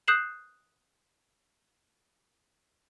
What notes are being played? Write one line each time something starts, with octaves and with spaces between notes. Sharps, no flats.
D#6 F#6 G6 C7 E7 F#7